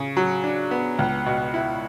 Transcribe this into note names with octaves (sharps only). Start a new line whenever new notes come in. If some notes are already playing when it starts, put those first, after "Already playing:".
Already playing: C#3
F#3
D4
B3
C#2
B2
E4